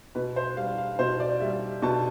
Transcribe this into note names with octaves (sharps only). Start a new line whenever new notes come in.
B2 B4
C5
G3 F5
F5
B2 C5
D5
G3 E5
B2 A5